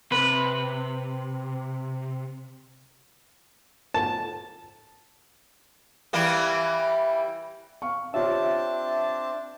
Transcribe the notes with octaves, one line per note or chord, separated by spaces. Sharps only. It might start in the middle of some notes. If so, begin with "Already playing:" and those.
C3 B4
A5
E3 G3 A#3
F5 C#6
C4 D4 F4 G4 C#5 E5 A5